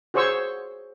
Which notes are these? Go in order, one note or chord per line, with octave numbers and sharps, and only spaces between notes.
F#4 G#4 C5 C#5 C#6 E6